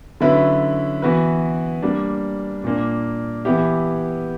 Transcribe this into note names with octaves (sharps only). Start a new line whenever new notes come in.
D3 F#3 C#4 E4 B4
E3 B3 F#4 B4
G3 A#3 D4
A#2 A#3 D4
E3 B3 E4 G4